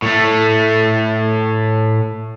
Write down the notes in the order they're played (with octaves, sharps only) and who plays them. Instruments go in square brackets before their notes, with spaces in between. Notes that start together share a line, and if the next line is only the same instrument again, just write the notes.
[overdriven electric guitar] A2 A3